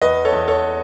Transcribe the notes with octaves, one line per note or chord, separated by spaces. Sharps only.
E2 B4 D#5
A4 C#5
E2
A4 C#5